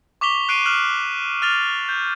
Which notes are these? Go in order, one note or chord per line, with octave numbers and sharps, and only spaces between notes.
C#6 D6 B6 F7 G7
C#6 F#6 C7 D7 D#7
F6 F#6 E7 F#7
F6 A6 F7 G7
G6